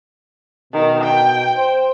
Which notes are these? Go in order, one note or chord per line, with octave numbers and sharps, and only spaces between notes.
B2 D#3
G5
C5